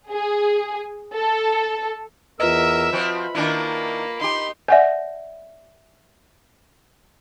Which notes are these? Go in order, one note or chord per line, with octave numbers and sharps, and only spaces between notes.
G#4
A4
E2 F4 A#4 B4 D#5 E5 E6
F3 C4 F#4 B5
D#3 A#3 D4 E4
D#4 G4 C6
C#5 D5 E5 F#5 G#5